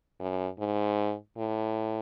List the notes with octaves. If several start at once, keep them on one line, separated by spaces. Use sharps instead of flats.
F#2
G#2
A2